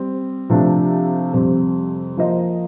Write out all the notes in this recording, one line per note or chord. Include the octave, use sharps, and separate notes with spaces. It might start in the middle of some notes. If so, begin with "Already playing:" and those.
Already playing: G3 C4
C3 F3 A3 D4
F2 C3 G3 C4
F3 A#3 F4 C5 D#5